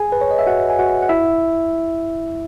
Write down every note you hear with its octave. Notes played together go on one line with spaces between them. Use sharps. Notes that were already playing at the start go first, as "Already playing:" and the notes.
Already playing: G#4 G#5
B4
C#5
D#5
E5
F#4 F#5
G#5
F#4 F#5
F#5
E4 E5